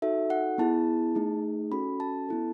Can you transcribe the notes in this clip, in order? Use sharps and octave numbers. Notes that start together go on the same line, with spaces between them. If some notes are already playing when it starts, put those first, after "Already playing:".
D#4 F#4 A4 E5
F#5
B3 E4 G#4 A5
A3 D#4 G#4
C#4 F#4 A4 B5
A5
B3 E4 A4